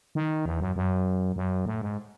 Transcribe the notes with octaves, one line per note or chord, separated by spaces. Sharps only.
D#3
E2
F#2
F#2
F#2
A2
G#2